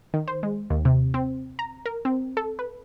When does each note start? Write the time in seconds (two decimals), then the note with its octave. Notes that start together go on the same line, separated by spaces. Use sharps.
0.14 D#3
0.28 C5
0.43 G#3
0.70 D#2
0.85 C3
1.14 C4
1.59 A#5
1.86 A#4
2.05 C4
2.37 A4
2.59 B4